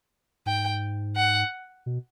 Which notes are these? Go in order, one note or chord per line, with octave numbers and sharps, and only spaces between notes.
G#2 G5
F#5
B2